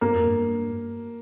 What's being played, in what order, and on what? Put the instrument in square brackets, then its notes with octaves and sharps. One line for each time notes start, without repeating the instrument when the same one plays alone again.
[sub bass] G2 [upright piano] A#3
[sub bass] F2
G2